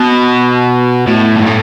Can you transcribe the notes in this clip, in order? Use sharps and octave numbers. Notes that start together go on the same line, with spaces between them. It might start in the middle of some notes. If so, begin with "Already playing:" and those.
Already playing: B2
A2
G2
A2